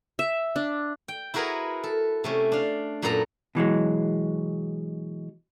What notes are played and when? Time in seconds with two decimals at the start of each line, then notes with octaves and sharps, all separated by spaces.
0.19 E5
0.56 D4
1.08 G5
1.34 E4 F#4 G#4 A#4 B4 F#5
1.84 A4
2.24 C3 A3 C#4
2.52 D4 F5
3.02 F#2 A#2 B3 A4 A#5
3.55 B2 E3 F#3 G#3